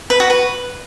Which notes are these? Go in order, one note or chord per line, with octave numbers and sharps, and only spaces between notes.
B4
F#4
B4